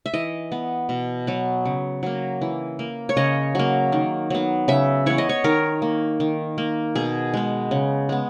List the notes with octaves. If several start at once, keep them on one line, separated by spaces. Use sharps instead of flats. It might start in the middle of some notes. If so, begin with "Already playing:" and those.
E5
E3 D#5
B3
B2
F#3 B3
C#3
F#3 A#3
E3
A#3
C#5
C#3 D#5
F#3 A#3
D#3
F#3 B3
C#3 E5
E3 B3 C#5
D#5
C#5
D#3 A#4
A#3
D#3
A#3
B2 G#4
G#3 B3
C#3
G#3 B3